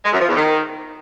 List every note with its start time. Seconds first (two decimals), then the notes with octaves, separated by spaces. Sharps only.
0.05 G#3
0.13 F#2
0.20 F3
0.28 E2
0.36 D#3